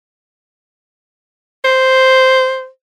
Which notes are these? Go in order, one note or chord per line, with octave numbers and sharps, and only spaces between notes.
C5